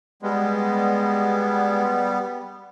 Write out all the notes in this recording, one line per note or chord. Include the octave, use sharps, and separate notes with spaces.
G3 G#3 B3